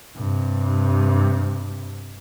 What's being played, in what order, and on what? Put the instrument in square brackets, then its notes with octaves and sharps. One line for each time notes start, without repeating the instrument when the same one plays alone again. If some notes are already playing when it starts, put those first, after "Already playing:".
[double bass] G2 C3